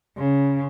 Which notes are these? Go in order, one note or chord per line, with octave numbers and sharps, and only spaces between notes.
C#3